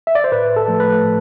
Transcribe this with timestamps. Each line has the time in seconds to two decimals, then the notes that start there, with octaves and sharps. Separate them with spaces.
0.07 E5
0.15 D5
0.24 C5
0.32 A2 B4
0.56 A4
0.68 F3 A3
0.80 B4
1.03 A2